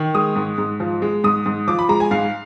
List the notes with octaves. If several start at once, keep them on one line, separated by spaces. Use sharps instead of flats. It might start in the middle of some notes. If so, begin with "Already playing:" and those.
Already playing: D#3
G#3 D#6
G#2
G#2
F3
G#3
G#2 D#6
G#2
F3 D6
B5
G#3 A#5
G#5
G#2 F5